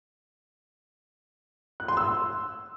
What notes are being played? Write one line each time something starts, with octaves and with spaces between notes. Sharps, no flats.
F#6
C6
E6